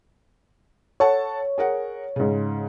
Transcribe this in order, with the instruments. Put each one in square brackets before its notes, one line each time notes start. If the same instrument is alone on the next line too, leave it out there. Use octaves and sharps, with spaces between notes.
[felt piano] A4 F#5 A5 [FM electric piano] C#5
[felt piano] G#4 A#4 F#5
G#2 C#3